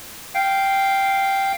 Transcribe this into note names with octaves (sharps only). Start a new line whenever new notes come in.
F5 G5